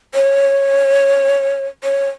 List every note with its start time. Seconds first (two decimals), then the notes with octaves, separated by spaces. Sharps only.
0.14 C#5
1.83 C#5